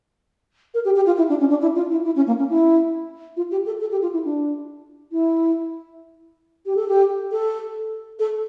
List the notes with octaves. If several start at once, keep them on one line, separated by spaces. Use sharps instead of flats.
A#4
G4
G4
F4
E4
D4
C#4
D4
E4
F4
E4
E4
C#4
A#3
C#4
E4
F4
G4
A4
A4
G4
F4
E4
D4
E4
G4
A4
G4
A4
A4